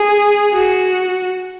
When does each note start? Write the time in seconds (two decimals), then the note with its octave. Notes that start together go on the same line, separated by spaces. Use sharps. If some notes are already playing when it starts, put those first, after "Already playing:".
Already playing: G#4
0.54 F#4